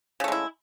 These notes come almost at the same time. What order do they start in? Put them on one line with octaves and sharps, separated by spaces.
C#3 A3 G#3 E4